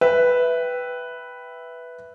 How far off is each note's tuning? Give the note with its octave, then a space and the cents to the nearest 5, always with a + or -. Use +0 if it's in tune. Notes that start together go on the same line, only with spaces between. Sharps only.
B4 +0 E5 +0 G5 +0